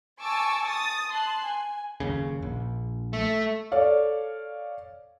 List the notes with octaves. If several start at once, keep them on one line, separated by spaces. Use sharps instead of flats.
G#5 A5 C#6 D6 E6
D#6 A6
A5 C6 F#6
G#5
F#1 D#2 C#3
A#1
A3 E5
A4 C#5 D5 F5